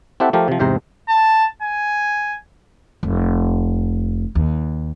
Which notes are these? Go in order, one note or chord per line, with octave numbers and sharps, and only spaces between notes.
C4 E4 G4 A4 E5 F#5
F3 A3 G4 A#4
C3 F3
E2 G#2 C3 C5 A#5
A5
G#5
F1
D#2